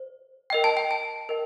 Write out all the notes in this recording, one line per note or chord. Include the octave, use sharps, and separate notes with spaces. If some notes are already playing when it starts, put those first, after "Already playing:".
Already playing: C5
A#4 D#5 G5
A5
G5
A5
A#4 D#5 G5